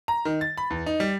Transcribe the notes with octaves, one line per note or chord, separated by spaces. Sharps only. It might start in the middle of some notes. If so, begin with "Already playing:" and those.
A#5
D#3
A6
B5
E2
D#4
G3